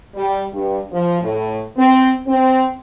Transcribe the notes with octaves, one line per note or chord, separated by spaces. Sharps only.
G3
G2
F3
A2
C4
C4